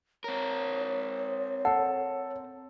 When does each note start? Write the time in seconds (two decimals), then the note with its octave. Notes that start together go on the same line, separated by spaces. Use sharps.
0.24 C4 A#4 C#5
1.65 A4 F#5